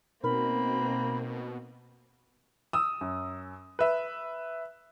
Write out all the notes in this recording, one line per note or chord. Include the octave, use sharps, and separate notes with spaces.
B2 A#3 C4 D#4 A#4 B5
D#6 E6
F#2
B4 E5